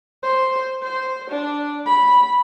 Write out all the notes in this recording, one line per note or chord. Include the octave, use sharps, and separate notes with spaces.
C5
C5
D4
B5